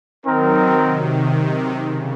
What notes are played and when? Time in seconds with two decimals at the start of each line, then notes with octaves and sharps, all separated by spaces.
0.25 D#3 F#3 C4 D#4 A#4
0.78 C3 D#3
1.85 C#3